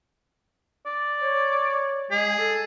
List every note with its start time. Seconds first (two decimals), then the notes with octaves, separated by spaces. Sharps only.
0.86 D5
1.21 C#5
2.11 G#3 G#4
2.39 A4